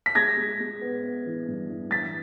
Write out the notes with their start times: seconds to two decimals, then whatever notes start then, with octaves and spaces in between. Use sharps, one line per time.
0.06 B6
0.15 G#3 G#6 A#6
0.37 G#3
0.60 G#3
0.81 B3
1.03 B3
1.26 E3
1.48 G2
1.69 E3
1.91 G2 A6 B6